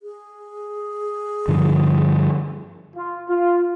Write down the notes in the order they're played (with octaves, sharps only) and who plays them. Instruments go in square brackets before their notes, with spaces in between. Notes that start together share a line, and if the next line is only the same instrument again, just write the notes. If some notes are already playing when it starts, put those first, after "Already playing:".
[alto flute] G#4
[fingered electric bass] G2 D3 F3
[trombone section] F4
F4